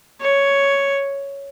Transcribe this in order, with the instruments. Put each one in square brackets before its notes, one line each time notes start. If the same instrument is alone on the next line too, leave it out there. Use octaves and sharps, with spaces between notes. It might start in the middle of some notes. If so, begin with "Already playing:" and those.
[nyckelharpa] C#5